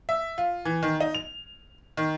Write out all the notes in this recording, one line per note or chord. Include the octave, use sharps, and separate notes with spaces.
E5
F4
E3
D#3
D#4
F7
D#3